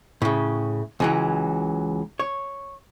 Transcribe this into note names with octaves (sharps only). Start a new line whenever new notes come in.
A2 C#3
C#2 E3 F#3
C#5